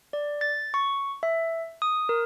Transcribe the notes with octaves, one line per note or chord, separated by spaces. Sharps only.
D5
A6
C#6
E5
D#6
A#4